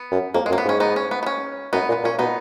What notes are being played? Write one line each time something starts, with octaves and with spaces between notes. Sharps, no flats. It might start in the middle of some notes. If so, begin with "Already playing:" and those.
Already playing: B3
F#2
F2 A#3
G#3
F#2
A#3
B3
G#2 C#4
B3 D#4
C#4
B3
B3
C#4
F#2 B3 D#4
A#2
B3
A#2 C#4
B2 B3 D#4